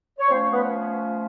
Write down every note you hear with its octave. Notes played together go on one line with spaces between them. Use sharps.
C#5
F3 A3 C4 C#4 C5
B3 B4